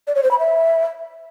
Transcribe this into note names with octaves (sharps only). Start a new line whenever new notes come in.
D5
C#5
C5
B5
E5